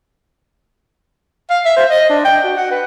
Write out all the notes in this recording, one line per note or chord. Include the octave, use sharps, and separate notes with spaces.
F5
E5
C5
D#5
D4
G5
F#4
F#5
B4